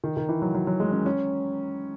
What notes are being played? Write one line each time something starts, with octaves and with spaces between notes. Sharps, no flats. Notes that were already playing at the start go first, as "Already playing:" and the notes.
D#3
D#3
E3
F#3
F#3
F#3
G#3
C#4
C#4